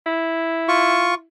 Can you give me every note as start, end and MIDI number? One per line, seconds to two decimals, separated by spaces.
0.06 1.26 64
0.68 1.15 65
0.68 1.15 85